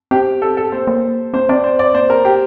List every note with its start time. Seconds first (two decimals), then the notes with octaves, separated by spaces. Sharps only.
0.11 C4 G4
0.42 A4
0.57 A4
0.72 A#3 C5
0.87 A#3
1.34 C4 C5
1.49 C4 D5
1.64 C5
1.79 D5
1.94 A#3 C5
2.10 A#4
2.25 G4